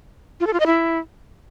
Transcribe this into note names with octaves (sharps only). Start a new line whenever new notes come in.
F4
A4
F4
D#5
E4